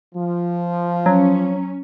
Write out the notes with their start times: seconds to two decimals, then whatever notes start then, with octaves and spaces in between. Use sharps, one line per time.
0.15 F3
1.06 F#3 C#4